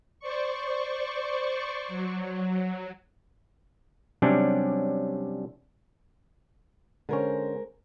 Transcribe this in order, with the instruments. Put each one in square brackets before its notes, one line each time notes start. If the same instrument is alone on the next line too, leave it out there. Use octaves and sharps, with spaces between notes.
[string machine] C5 D5 C#6
F#3
[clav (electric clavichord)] C3 F#3 G3 C#4 D4
[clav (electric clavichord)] D3 C#4 [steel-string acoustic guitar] G#3 A#4 C5